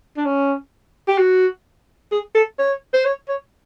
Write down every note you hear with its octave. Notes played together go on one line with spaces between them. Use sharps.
D4
C#4
G4
F#4
G#4
A4
C#5
C5
C#5
C#5